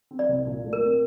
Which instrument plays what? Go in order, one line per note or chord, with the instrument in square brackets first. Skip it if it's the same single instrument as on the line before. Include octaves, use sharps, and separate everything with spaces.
[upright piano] C4
[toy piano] D5
[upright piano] C2
A#2
A3
[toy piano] A#4
[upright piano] C4